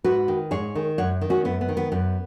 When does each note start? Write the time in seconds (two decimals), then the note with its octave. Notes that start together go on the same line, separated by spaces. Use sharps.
0.04 G#2 F#4 B4
0.28 D#3
0.51 G#2 G#4 C#5
0.75 D#3
0.98 F#2 C#5 F#5
1.21 D#3
1.30 C#4 F#4
1.45 F#2 B3
1.61 B3
1.69 D#3
1.77 B3
1.92 F#2 B3